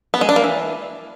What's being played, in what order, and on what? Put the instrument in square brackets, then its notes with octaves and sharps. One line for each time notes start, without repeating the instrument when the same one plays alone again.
[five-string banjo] B3
G#3
D4
A#3
E3